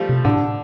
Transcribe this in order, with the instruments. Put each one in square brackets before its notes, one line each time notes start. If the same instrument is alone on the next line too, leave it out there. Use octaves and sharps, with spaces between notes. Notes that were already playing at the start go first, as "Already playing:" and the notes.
Already playing: [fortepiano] F3 G3 A3
[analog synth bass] C3
[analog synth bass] A2 [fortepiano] D3